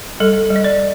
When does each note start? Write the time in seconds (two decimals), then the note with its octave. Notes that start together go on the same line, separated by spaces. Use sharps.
0.20 G3 A4
0.50 G3
0.56 D#5
0.64 D5